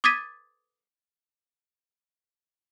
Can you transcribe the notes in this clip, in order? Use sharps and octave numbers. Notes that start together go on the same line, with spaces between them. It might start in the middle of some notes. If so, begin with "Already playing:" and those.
D6 D#6 G#6 A6 B6 D#7